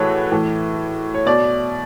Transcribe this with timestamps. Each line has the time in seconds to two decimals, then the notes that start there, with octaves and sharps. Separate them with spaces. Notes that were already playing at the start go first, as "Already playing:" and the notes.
Already playing: A2 E3 F#4 G#4 A4 B4 C#5
0.31 A2 E3
1.14 C#5
1.26 B2 D5